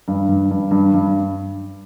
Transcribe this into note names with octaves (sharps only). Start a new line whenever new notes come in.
G2
G2
G2
G2
G2